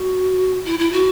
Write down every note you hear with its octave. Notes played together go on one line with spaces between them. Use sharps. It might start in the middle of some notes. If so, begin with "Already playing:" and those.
Already playing: F#4
E4
E4
F#4